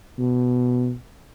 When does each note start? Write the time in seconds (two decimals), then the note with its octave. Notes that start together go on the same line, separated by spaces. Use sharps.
0.18 B2